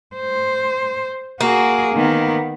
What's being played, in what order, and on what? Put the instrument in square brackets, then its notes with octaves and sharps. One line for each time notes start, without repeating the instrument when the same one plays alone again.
[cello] C5
[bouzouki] A#3 [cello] F#4 G#4
[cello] D#3 B3